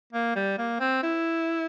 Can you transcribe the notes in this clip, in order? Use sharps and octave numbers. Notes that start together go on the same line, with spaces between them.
A#3
G3
A#3
C4
E4